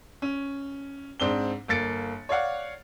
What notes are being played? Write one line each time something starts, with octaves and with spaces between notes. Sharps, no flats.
C#4
G#2 C4 D4 G7
G1 A#3 A6 C#7 D7
C#5 D5 F5 F#5